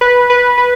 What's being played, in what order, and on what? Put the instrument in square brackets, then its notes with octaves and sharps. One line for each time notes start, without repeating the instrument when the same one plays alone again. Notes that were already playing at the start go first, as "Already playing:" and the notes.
[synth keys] B4
B4
B4